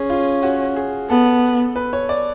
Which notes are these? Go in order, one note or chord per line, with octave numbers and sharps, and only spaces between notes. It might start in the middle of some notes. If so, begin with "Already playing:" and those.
Already playing: C#4 G#4
F4
F#4
G#4
B3 A4
B4
C#5
D5